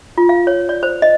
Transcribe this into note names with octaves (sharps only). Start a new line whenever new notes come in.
F4
F5
C#5
D5
C5
D#5